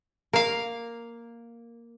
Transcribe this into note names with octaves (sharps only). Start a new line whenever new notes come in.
A#3 A#4 F5